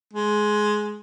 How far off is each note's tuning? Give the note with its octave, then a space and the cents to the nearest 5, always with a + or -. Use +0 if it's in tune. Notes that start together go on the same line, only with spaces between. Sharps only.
G#3 +15